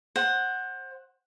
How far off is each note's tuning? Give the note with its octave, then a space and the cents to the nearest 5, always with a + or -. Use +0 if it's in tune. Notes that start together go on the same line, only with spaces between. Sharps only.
C5 +25 F#5 +0